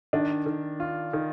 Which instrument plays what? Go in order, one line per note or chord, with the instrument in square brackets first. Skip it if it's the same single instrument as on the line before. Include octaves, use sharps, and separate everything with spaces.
[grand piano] D#3 [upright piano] D4
[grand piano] D#3
F4
D#3